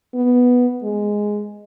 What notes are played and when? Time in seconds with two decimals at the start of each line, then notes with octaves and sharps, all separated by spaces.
0.15 B3
0.83 G#3